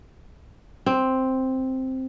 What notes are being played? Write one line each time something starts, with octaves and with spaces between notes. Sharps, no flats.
C4